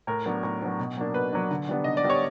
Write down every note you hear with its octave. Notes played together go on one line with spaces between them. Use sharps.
A2 A#4
F#3 B3 D4
A2
F#3 B3 D4
B2
F#3 A#3 D4
B2 B4
F#3 A#3 D4
D3
G3 B3 D4
D3 D#5
D5
G3 B3 D4
C#5